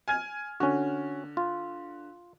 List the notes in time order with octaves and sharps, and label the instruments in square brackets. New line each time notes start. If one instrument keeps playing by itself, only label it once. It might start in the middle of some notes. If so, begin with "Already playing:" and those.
[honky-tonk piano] G#5 F6 G#6
[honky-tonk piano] D3 [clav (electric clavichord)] C#4 F#4
[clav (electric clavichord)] F4